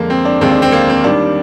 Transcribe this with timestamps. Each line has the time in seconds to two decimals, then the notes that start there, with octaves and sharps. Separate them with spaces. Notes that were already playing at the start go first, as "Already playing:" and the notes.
Already playing: F2 D3 G#3 A#3
0.10 C4
0.25 D4
0.41 D#2 D3 G#3 C4
0.51 D4
0.62 C4
0.72 A#3
0.89 C4
1.04 D#2 D#3 G3 D4